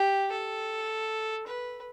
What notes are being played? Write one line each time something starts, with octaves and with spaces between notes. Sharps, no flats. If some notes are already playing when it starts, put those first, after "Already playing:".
Already playing: G4
A4
B4